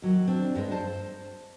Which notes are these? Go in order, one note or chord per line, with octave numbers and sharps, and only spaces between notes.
D#2 F#3
C4 D4
G2 G#3 D4
C5 A5